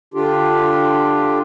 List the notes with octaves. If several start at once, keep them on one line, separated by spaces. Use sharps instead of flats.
D3 D4 F4 G4